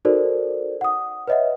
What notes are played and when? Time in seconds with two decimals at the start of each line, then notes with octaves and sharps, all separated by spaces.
0.05 D#4 F#4 A4 A#4 C5 D5
0.81 F#5 D#6
1.28 B4 C#5 D#5 E5 F#5